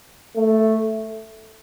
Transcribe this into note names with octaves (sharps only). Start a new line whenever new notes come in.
A3